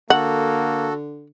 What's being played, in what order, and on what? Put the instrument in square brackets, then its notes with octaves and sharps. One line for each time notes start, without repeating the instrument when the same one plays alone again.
[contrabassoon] D3 [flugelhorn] A#3 [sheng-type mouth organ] F#4 A4 [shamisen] F#5